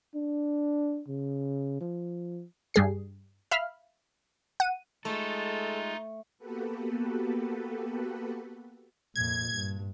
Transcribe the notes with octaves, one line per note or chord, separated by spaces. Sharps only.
D4
C#3
F3
G2 G3 G#4 C7
E5 F5 B5 F6
F#5 D#7
G#3 A3 D#4 F4 A4
A#3 B3 F#4 G4 A4 B4
F2 A#2 G#6
G2